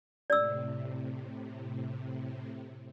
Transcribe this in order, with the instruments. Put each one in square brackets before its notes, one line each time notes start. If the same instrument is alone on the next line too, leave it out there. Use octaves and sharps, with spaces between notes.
[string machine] A2 C3 [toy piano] D5 E6